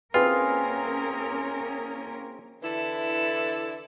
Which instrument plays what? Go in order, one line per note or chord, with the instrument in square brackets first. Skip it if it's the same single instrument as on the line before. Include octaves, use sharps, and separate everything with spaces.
[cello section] A#3 C#4 A#4 [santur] C4 E4 G#4 [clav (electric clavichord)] F4 [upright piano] B4
[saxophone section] D3 E3 E4 A4